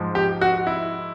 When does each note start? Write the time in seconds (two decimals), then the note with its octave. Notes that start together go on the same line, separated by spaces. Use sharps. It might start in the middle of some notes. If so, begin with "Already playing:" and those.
Already playing: G#2 F3 G#3
0.15 G4
0.41 F#4
0.67 E4